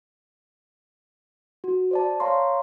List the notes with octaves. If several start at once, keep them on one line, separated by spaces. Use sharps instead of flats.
F#4
C5 D5 A5
C#5 F5 A#5 C6 C#6